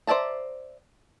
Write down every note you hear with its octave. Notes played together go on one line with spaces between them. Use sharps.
C5 D5 E5 A5 A#5